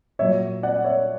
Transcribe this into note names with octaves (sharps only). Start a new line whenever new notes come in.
A#2 F#3 C#5 E5
D5 F#5
C#5 E5